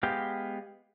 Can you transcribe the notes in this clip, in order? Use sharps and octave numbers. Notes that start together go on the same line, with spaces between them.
G#3 B3 G4 F5 G5